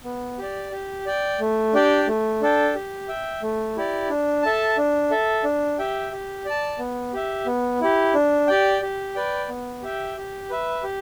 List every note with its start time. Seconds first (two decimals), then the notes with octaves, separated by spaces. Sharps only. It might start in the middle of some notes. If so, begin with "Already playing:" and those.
0.05 B3
0.38 G4 D5
0.72 G4
1.06 D5 G5
1.40 A3
1.73 D4 G4 D5 G5
2.07 A3
2.41 D4 A4 G5
2.75 G4
3.08 E5 G5
3.43 A3
3.76 E4 G4 D5
4.09 D4
4.43 A4 E5 A5
4.78 D4
5.11 A4 E5
5.44 D4
5.79 G4 E5 G5
6.12 G4
6.45 D5 A5
6.79 B3
7.13 G4 E5
7.46 B3
7.81 E4 G4
8.14 D4
8.47 G4 D5 G5
8.82 G4
9.15 B4 D5 G5
9.49 B3
9.82 G4 E5 G5
10.17 G4
10.50 B4 E5
10.83 G4